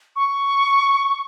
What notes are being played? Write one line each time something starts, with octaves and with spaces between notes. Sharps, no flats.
C#6